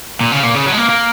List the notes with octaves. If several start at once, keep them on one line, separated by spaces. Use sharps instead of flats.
A#2
C#3
A#2
C#3
F#3
G#3
A#3
A#3